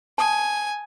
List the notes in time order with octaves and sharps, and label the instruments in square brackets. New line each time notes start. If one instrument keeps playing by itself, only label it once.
[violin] G#5 [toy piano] A5 D#6